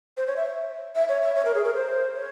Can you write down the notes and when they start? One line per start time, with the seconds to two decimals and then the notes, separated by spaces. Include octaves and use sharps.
0.17 C5
0.27 C#5
0.37 E5
0.95 E5
1.09 C#5
1.22 E5
1.35 C#5
1.45 A#4
1.55 G#4
1.64 A#4
1.74 C5
2.14 C#5